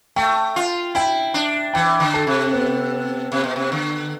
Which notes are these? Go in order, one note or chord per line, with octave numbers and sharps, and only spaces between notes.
A3 G5
F4
E4 G5
D4
E3 G5
D3
A4
C3
B3
C3
B2
C3
D3